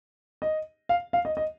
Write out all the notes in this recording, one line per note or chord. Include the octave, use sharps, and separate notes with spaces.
D#5
F5
F5
D#5
D#5